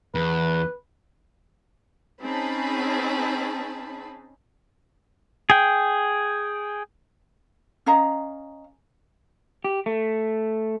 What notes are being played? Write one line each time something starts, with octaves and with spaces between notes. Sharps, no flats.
E2 B4
C4 C#4 D#4 G#4 A5 B5
G#4 G5
C#4 D#5 F5 A#5
G4
A3